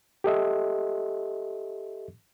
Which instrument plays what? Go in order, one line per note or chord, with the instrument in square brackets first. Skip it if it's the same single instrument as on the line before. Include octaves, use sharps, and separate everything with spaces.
[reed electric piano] G4 A4 D#5 E5